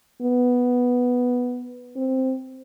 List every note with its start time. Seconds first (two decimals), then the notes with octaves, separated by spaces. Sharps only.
0.22 B3
1.96 C4